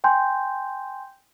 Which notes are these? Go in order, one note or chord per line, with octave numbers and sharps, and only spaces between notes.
G5 G#5 C6 G6